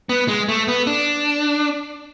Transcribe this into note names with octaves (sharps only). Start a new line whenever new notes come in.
B3
G#3
A3
B3
D4